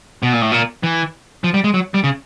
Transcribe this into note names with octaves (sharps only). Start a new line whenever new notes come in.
B2
A#2
A2
A#2
E3
F3
G3
G#3
F#3
G3
C#3